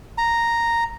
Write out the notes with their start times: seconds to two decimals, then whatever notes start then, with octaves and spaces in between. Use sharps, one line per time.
0.18 A#5